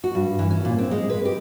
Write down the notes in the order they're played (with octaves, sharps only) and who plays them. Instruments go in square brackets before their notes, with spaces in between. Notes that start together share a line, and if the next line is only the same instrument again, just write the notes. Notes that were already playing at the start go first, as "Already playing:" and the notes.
[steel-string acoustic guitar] F#4
G2
E3
C#4
A#2
C4
G#3
B4
G4